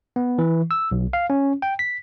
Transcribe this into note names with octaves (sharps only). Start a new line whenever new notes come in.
B3
E3
E6
B1
F5
C#4
G5
B6